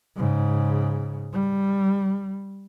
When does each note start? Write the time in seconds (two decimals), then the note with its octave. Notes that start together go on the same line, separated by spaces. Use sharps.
0.16 G#2 C#3
1.33 G3